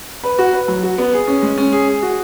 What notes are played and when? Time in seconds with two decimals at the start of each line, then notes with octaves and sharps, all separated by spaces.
0.24 B4
0.38 F#4
0.53 B4
0.68 F#3
0.83 F#4
0.98 B3
1.13 G#4
1.27 C#4
1.42 G#3
1.58 C#4
1.72 G#4
1.88 G#4
2.02 F#4